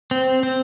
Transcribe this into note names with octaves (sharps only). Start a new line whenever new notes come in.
C4
C4